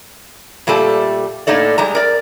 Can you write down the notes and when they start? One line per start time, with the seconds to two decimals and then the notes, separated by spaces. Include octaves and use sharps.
0.67 A#2 G3 A3 A4 A5
1.47 A2 A#3 D#4 A4 D5
1.78 G3 G#3 A#5
1.95 A#4 D5